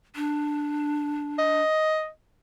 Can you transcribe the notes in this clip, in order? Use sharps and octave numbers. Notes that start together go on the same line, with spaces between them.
D4
D#5